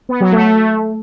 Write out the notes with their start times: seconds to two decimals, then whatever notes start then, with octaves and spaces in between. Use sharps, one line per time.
0.09 B3
0.21 F#3
0.32 A3